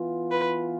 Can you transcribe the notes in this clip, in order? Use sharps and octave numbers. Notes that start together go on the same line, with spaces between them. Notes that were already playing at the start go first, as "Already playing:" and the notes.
Already playing: E3 B3 F4
B4